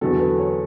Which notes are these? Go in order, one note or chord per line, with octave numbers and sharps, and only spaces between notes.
E2 D3 F#3 A4
B4
C#5